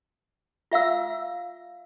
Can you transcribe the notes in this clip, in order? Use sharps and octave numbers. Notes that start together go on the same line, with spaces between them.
F4 E5 F5 E6